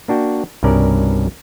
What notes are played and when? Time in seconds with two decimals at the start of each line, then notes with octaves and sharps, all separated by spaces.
0.08 A#3 D4 F#4 G5
0.63 C2 G2 B2 C#4 A#4 D5